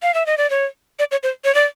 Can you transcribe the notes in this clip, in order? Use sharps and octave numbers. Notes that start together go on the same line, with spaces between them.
F5
E5
D#5
D5
C#5
D5
C#5
C5
C#5
D5